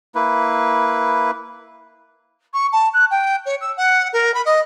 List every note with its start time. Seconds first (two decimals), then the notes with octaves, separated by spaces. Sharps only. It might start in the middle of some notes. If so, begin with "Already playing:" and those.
0.15 A#3 E4 B4
2.54 C#6
2.73 A5
2.94 F#6
3.11 G5
3.46 C#5
3.61 E6
3.77 F#5
4.13 A#4
4.34 B5
4.46 D#5